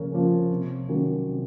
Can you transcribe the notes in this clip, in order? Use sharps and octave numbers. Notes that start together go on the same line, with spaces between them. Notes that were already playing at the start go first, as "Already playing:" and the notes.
Already playing: C#3 F3 A#3 A#4 C#5
F3 A#3 C#4
C3
D#3 F#3 A#3 C#4
C3